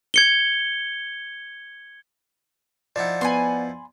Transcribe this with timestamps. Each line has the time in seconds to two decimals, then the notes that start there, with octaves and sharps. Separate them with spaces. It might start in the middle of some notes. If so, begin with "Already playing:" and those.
0.14 G#6 C#7 G7
2.96 F3 D#4 E4 D5 F#5
3.21 B3 G#5 B5 C6